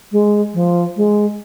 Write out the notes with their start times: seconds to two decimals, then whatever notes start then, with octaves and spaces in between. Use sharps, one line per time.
0.12 G#3
0.54 F3
0.96 G#3